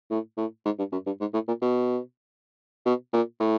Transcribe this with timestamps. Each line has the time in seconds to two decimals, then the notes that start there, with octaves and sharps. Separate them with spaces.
0.11 A2
0.37 A2
0.66 G#2
0.79 G2
0.92 F#2
1.06 G2
1.21 G#2
1.34 A2
1.48 A#2
1.62 B2
2.85 B2
3.13 A#2
3.40 A2